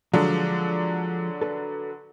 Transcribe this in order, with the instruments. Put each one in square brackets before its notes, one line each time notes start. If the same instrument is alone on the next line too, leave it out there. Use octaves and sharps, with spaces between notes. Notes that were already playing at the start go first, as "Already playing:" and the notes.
[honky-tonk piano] D3 F#3 D4 [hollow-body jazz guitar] F3 G#3
[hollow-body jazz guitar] A4 B4